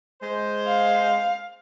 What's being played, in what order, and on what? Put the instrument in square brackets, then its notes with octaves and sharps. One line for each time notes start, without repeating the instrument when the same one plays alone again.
[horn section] G#3 C5
[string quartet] F5